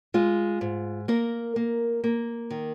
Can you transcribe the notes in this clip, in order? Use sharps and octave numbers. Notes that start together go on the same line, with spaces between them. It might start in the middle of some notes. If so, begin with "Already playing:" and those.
G#3 F4
G#2
A#3 A#4
A#3
A#3
D#3